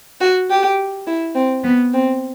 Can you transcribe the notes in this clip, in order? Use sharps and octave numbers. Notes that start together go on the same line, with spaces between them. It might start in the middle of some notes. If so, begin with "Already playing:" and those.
F#4
G4
E4
C4
B3
C4